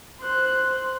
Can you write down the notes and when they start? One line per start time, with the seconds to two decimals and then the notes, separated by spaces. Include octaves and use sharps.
0.21 C5 F#6